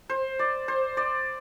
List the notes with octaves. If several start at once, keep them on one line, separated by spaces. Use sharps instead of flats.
C5
D5
C5
D5